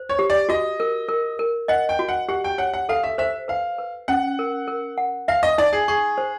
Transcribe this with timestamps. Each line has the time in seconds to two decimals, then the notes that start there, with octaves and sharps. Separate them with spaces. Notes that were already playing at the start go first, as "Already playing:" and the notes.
Already playing: C5
0.09 C#5
0.19 G4
0.30 D5
0.49 F#4 D#5
0.80 A#4
1.09 A#4
1.39 A#4
1.68 D#5 F#5
1.89 G5
1.99 F#4
2.09 F#5
2.29 G4 F#5
2.44 G5
2.58 C#5 F#5
2.74 F#5
2.89 A4 F5
3.03 E5
3.18 C5 E5
3.48 B4 F5
3.78 B4
4.08 C#4 F#5
4.39 A#4
4.68 A#4
4.98 F#5
5.28 E5 F5
5.43 D#5
5.58 D#4 D5
5.73 G#4
5.88 G#4 C#6
6.18 C5